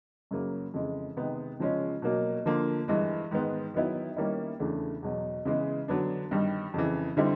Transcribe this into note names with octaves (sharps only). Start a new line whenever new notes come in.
F#2 C#3 F#3 A#3
F2 C#3 E3 G#3
C3 D#3 G#3 B3
C#3 F3 G#3 C#4
B2 F#3 A#3
D3 F3 A#3
G2 E3 G#3
G#2 D#3 G#3 B3
D#3 F#3 B3 E4
D#3 G3 A#3 C#4 E4
E2 C#3 E3 A3 D4
E2 B2 F#3
C#3 E3 G#3 B3
D3 F#3 B3 D4
G2 D#3 G3
F2 C#3 E3
D3 G3 C4 E4